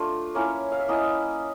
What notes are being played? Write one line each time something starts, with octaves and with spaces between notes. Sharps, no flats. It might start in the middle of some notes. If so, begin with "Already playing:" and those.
Already playing: A3 D4 F4
A#3 C#4 E4 C#5
F5
E5
A#3 C#4 E4 D#5